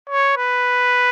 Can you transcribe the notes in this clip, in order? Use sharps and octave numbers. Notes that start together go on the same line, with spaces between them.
C#5
B4